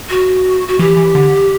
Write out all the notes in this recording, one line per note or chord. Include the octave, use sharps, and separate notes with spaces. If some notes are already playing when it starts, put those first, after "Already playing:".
F#4
F#4
E3 G4
E3
D3